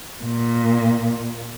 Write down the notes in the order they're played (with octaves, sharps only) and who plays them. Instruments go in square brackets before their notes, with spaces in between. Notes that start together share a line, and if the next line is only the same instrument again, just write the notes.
[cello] A#2